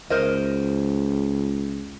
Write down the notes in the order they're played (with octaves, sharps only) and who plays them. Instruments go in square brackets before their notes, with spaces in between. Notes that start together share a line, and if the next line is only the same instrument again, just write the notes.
[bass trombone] C#2 [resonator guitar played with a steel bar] A#4 C5 D#5